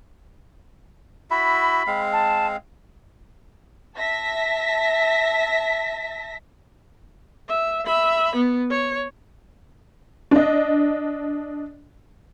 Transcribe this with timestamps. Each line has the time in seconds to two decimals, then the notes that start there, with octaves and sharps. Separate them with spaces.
1.31 E4 F#4 E5 B5
1.87 G#3 C4 F5
2.12 A5
3.97 E5 A5 A#6 B6
7.49 E5
7.86 E5 B5
8.36 B3
8.70 C#5
10.31 D4 D#5